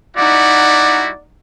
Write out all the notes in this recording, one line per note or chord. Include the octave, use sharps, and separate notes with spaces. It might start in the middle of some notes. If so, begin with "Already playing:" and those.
G3 D#4 E4 F#4 D5 F#5